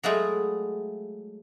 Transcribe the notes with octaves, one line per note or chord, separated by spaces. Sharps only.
F#3 G#3 A3 E4 F4 G#4